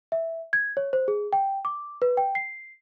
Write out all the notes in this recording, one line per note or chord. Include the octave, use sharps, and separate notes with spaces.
E5
G#6
C#5
C5
G#4
G5
D6
B4
G5
C7